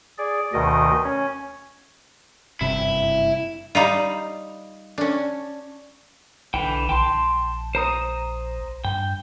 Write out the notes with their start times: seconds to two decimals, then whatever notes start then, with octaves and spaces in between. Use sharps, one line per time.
0.18 G#4 D5
0.53 D2 B2 D#3 D#5
1.03 C#4
2.61 F#1 G2 C3 E4
3.75 G3 D#4 F4
4.98 C#4 D4
6.54 B1 D3 E3 G5
6.89 A#1 G5 A5 C6
7.75 C5 A#5 D#6
8.85 G2 G5